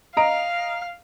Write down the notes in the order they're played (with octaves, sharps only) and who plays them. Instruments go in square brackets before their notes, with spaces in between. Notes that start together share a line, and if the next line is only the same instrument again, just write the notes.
[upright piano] D#5 A#5 D7 [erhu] F5